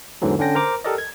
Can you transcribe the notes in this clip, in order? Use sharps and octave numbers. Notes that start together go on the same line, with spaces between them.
E2 G#2 D3 E3 F#3
D3 C#4 D4 G5 A#6
A#4 C5 A#5 D6
G4 A4 A#4 D5 D#5
G#6